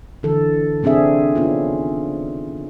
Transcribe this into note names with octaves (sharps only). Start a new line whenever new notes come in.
D3 E3 A4
C3 C4 D4 G#4 E5
B3 C#4 D#4 F4